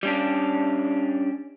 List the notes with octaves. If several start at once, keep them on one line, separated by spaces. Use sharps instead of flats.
G3 C#4 D4